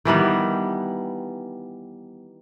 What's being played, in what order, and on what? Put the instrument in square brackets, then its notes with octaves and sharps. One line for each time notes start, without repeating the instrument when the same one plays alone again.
[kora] D#3 E3 G3 B3